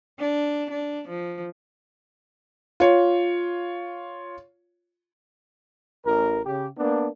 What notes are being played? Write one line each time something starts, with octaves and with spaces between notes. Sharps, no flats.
D4
D4
F3
F4 C#5
A1 A#4
C#3 G4
A#3 B3 D4